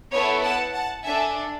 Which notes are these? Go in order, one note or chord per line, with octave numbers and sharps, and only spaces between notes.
B3 E4 A4 C#5
F#5 A5
F#5 A5
D4 A4 E5 G#5